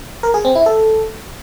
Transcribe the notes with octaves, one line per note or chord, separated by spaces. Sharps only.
A#4
G#4
C4
E4
A4